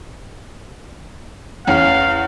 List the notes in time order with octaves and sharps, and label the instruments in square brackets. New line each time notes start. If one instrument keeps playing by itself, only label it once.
[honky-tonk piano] E2 C#4 [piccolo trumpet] F5